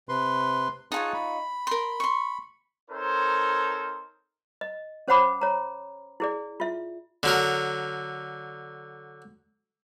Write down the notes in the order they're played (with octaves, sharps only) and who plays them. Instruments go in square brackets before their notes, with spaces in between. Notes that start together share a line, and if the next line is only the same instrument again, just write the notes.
[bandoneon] C3 B4 C6
[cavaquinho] D#4 F4 C#5 [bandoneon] G#4 A5 F#6
[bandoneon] B5
[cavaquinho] A#4 C6
C6 C#6
[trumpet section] C4 D#4 A4 A#4 C5 C#5
[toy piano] D#5
C#4 C5 C#5 F#5 B5 D6
C#5 A#5
E4 G#4 D5
F4 E5
[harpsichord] D3 F#3 A#4